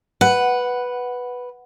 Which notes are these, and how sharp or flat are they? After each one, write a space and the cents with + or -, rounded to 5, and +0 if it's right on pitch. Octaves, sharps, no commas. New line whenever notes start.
B4 +0 F#5 +0